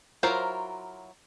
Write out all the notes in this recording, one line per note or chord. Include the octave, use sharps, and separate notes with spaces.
F#3 E4 F4 A#4 C5